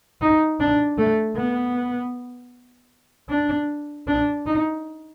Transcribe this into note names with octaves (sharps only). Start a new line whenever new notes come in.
D#4
D4
A3
B3
D4
D4
D#4